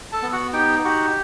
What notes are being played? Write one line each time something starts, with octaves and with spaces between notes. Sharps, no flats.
A4 A5
B3
F#4 F#5
D#4 G4 G5
F#4 G4 F#5